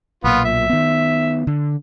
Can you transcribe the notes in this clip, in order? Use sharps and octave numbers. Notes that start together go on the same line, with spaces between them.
B1 A#2 B3 F4
E5
D#3 B3
D3